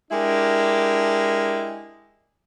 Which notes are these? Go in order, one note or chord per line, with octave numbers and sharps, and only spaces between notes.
G#3 D4 E4 G4 A#4